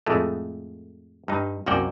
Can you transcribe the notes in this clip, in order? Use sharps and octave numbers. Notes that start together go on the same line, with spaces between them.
F2 A2 G#3 A3
G2 D#4
C2 F#2 A#3 F#4 D5 G5